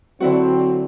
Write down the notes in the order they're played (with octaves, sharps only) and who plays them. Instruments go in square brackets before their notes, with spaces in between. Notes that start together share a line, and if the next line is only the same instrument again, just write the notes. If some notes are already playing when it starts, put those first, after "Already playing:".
[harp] D3 E4 F#4 [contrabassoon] F#3 [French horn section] C4